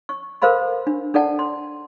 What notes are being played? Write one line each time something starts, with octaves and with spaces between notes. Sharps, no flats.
C#6
A4 A#4 C5 F5 B5 C6
D4
D4 A4 D5 F#5 A5
C6